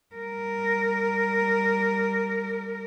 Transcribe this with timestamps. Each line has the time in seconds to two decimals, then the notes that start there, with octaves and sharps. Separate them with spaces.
0.15 G3 A#4